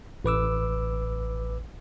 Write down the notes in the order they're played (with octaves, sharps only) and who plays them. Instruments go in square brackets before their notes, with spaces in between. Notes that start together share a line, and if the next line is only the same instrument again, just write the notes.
[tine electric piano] A1 B4 D6 E6